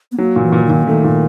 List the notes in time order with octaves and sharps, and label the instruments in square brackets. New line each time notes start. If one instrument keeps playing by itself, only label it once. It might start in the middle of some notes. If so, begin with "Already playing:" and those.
[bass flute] B3
[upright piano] F#3 [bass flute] A#3
[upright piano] A#2
[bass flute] E3
[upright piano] A#2
[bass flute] D#3
[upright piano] A#2
[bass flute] D#3 [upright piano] A3
[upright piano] A#2